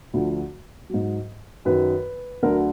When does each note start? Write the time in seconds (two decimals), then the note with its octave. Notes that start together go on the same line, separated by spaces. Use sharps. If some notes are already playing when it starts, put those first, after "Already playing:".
0.14 D2 D3 F3
0.89 G#2 F#3
1.65 F#2 D#3 F#3 B4
2.42 D2 D3 F#3 A#4